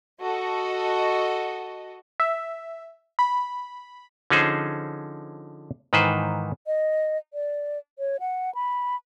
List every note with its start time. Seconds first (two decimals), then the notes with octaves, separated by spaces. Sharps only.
0.20 F#4 A4 D#5
2.20 E5
3.19 B5
4.30 D3 F3 C#4 D#4 G#4 C5
5.93 G#2 D#3 E3 B4 C5
6.67 D#5
7.34 D5
7.99 C#5
8.20 F#5
8.55 B5